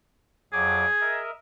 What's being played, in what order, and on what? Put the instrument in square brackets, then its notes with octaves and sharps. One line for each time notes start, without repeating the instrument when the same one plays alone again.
[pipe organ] F2 F#3 D6 [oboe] G#4
[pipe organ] A#4 D#5 E5